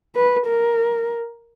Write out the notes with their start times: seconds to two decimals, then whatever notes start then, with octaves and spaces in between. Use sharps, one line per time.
0.16 B4
0.46 A#4